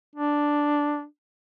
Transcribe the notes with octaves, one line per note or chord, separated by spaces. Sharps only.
D4